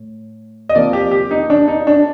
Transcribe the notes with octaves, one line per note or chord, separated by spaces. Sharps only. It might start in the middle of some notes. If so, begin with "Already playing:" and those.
Already playing: A2
D#5
C3 F3 A#3 D5
G4
G4
D#4
D4
D#4
D4